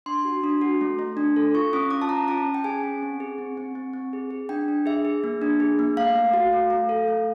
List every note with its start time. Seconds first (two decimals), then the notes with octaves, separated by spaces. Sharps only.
0.06 D4 C6
0.25 F#4
0.44 D4
0.61 F#4
0.81 A3
0.99 A3
1.17 D4
1.36 A4
1.54 F4 C#6
1.73 C#4 D#6
1.91 F4 D6
2.02 A5
2.09 C#4 A#5
2.28 C#4 A5
2.46 C#4
2.54 G5
2.64 G#4 G#5
2.84 C#4
3.02 C4
3.20 G#4
3.38 C4
3.57 C4
3.75 C4
3.93 C4
4.13 G#4
4.30 G#4
4.49 D4 G5
4.68 D4
4.86 G#4 E5
5.05 G#4
5.24 A#3
5.42 D4
5.60 G#4
5.79 A#3
5.97 A3 F5
6.15 A3
6.34 F#4
6.53 A3
6.70 A3
6.89 A4
7.08 A3